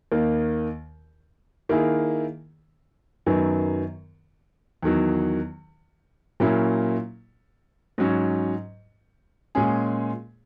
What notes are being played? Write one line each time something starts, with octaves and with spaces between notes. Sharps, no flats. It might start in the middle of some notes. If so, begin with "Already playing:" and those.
D#2 D#3 A#3
D#3 A#3 E4 G#4
F#2 D#3 F#3 B3
E2 D#3 F#3
A#2 F#3 A#3 C#4 E4
G#2 F#3 C#4
A#2 G#3 C#4 G#4